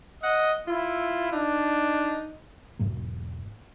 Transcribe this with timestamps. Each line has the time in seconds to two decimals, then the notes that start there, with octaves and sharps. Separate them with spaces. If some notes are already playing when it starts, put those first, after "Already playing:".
0.23 D#5 F#5
0.67 E4 F4
1.32 D4 D#4
2.79 E1 G#2 F#3 A#3